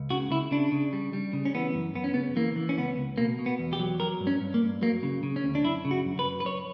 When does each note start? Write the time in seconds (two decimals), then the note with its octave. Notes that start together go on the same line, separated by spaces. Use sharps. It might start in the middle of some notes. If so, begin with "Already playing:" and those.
Already playing: C#2
0.10 C#3 F#4
0.31 C#3 E4
0.51 C#3 D4
0.72 C#3
0.93 G3
1.13 G3
1.33 C#3
1.45 C#4
1.55 E3 B3
1.75 F#2
1.95 F#2 B3
2.04 C#4
2.14 C#3 B3
2.36 E3 A#3
2.56 E3
2.69 C#4
2.78 C#2 B3
2.98 C#2
3.18 B2 A#3
3.39 B2
3.46 B3
3.59 E2
3.73 G4
3.80 F#3
4.00 F#3 A#4
4.20 G2
4.27 C#4
4.41 G2
4.54 A#3
4.62 G2
4.82 F#3 A#3
5.03 C#3
5.23 C#3
5.36 C#4
5.44 D2
5.55 D4
5.64 F#2 E4
5.85 C#3
5.91 F#4
6.05 F#2
6.19 B4
6.25 F#2
6.40 B4
6.45 F#2 C#5